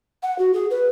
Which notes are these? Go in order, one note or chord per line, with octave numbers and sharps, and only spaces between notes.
F#5
F#4
G#4
B4